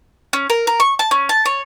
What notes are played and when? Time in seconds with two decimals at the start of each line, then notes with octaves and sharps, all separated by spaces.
0.33 C#4
0.50 A#4
0.67 A#4
0.80 C#6
0.99 A5
1.11 C#4
1.29 A5
1.46 C#5